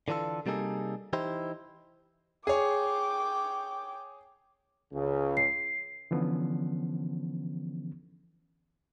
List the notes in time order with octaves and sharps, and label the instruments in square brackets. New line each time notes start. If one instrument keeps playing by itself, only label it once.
[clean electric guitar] D3 E3 D4 F4 A4
C3 G3 A#3 D#4 G#4 A4
E3 D#4 E4 G4 C5
[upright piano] G#4 C#5 [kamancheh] G5 D6
[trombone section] C#2 C#3
[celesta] C7
[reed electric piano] D3 E3 F3 B3 C#4